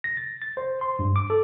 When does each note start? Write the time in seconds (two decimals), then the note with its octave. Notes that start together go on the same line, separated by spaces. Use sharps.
0.04 A#6
0.17 A6
0.42 A6
0.57 C5
0.81 C6
0.99 G2
1.16 D6
1.30 A4